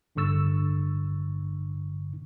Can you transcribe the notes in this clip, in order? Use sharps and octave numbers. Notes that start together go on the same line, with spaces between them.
G#1 G2 D3 C#6 E6 A6